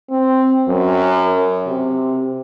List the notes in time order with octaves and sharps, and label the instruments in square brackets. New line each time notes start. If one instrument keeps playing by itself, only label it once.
[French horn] C4
F#2
C3